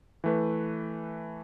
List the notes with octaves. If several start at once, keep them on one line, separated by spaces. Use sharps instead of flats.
E3 A3 B4